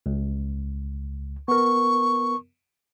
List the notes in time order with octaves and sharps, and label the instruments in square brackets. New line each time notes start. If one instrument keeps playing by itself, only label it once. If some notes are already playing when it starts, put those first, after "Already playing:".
[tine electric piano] C#2
[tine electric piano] B3 A#4 [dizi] C#6